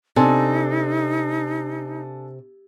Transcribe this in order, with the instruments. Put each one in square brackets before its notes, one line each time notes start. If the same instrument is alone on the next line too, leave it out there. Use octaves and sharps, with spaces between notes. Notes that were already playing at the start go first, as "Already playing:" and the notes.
[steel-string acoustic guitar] C3 [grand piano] D4 A4 G#5 [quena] D#4